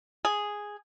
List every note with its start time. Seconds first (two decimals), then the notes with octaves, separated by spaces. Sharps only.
0.25 G#4